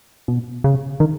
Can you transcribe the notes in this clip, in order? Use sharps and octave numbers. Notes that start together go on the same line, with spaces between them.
B2
C#3
D#3